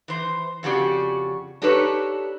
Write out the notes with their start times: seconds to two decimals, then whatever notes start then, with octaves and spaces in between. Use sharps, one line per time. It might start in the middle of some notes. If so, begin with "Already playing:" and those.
0.08 E3 C5
0.63 F2 C#3 F#4 G4 D5
1.62 D4 D#4 G4 A4 B4 C#5